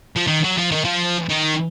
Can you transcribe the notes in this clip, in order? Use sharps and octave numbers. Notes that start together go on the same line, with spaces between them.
F3
D#3
F#3
F3
D#3
F3
D#3